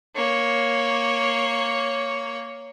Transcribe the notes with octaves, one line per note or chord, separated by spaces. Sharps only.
A#3 C#5